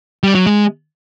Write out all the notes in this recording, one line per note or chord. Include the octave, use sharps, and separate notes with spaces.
G3
F#3
G#3